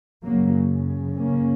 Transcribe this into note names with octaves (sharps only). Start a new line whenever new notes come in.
F#2 C#3 F#3 A#3
A#3 C#4